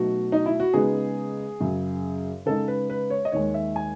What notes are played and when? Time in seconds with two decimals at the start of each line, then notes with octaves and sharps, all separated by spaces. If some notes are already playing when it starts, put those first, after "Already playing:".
Already playing: B2 F#3 A3 D#4 F#4
0.32 D#4
0.46 E4
0.60 F#4
0.73 C#3 G#3 B3 D#4 G#4
1.60 F#2 C#3 F#3
2.46 C#3 G#3 D#4 A4
2.68 B4
2.90 B4
3.10 C#5
3.25 D#5
3.32 D#2 D#3 G#3 C#5
3.54 E5
3.76 G#5